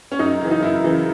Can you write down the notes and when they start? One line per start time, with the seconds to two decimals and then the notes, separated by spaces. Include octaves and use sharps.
0.12 C#4
0.19 F#2 D#4
0.41 C#3 E3
0.51 D#4
0.62 F#2 E4
0.84 C#3 E3